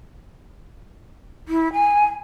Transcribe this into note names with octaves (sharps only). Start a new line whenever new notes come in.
E4
G#5